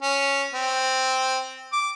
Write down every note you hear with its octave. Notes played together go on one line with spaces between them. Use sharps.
C#4
C4
D6